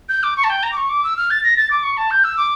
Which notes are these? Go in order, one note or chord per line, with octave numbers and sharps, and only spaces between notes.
G6
D6
C#6
A5
G5
A#5
D6
C#6
D6
E6
F6
A6
A#6
A6
D6
C#6
A5
G6
E6
D6